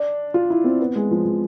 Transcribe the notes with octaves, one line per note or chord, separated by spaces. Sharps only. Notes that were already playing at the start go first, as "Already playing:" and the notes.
Already playing: D4
F4
E4
C4
B3
G#3
F3
F3